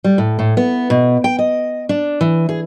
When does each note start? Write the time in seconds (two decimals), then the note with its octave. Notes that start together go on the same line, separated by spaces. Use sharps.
0.04 G3
0.18 A2
0.39 A2
0.57 B3
0.90 B2
1.24 G5
1.39 D#5
1.89 D4
2.21 E3
2.49 G#4